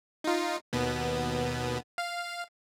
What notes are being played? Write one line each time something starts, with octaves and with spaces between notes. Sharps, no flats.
D#4 F4
D#2 B2 B3
F5